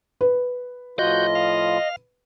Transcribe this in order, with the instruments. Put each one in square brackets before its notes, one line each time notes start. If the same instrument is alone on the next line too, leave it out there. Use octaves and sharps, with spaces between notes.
[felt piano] B4
[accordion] A2 F3 F4 [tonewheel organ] F#4 G6 [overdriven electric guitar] D#5
[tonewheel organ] F5